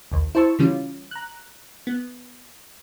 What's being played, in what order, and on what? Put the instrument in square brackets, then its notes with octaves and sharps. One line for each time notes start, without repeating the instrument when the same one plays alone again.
[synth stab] A#1 D#2
E4 C5 A5 C#6 E6
C#3 E3 G3 C#4 F4
A#5 F#6
B3